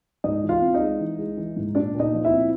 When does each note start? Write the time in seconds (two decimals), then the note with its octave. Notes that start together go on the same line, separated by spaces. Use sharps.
0.24 G#2 D#4 D#5
0.43 E3
0.49 F4 F5
0.61 C4
0.74 D#4 D#5
0.80 G#3
1.00 E3
1.18 G#3
1.37 E3
1.56 G#2
1.75 A#2 D4 D5
1.94 A#2
1.99 D#4 D#5
2.13 F3
2.25 E4 E5
2.31 C4